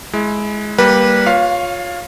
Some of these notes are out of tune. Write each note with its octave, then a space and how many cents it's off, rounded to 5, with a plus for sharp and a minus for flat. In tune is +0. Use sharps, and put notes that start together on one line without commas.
G#3 +15 E4 +0
G3 -5 A#3 +0 B4 -20
F4 +25 C#5 +0 F5 +0